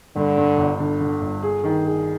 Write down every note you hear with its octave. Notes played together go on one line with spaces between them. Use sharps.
G2 D3
G2
G1
D3
D3
G1
G#4
D#3
G#4